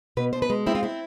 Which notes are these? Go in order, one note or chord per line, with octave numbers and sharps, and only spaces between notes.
B2 B4
B2 C5
B4
G#3
C4 E4
F4
C4 E4